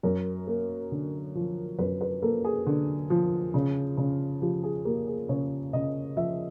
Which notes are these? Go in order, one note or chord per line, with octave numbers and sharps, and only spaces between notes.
F#2 A#4
A#3
D3
F3
F#2 B4
B4
A#3 A4
G#4
D3
F3
C#3
C#3
F3 G4
G#4
A#3 G4
G#4
C#3 C#5
C#3 D#5
F3 E5